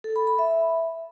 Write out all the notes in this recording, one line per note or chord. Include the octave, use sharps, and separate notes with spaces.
A4
B5
B5
E5